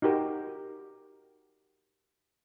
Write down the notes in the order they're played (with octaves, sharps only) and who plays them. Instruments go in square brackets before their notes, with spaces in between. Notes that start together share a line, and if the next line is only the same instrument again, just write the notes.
[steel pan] D#4 F#4 G4 A#4